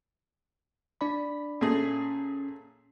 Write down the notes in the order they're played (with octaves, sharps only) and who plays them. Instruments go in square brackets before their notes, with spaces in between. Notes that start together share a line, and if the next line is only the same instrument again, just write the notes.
[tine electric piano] D4 D5 B5
[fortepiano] A#2 A3 G#4 [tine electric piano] C#4